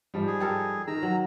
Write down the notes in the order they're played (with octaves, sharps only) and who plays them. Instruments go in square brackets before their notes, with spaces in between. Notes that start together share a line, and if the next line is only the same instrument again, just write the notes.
[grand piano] G#2 F3 G3
[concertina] G#4
[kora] G4 A4 A#4
[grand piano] D#3 [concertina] A#5 E6
[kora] F#3